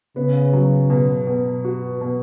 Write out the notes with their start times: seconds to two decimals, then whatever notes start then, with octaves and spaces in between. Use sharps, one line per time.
0.16 C#3 B3
0.53 F#3
0.90 B2
1.27 B2
1.65 F#4
2.01 B2